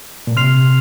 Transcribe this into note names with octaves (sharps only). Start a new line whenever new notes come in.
A#2
C3 C6 F6 C7 F7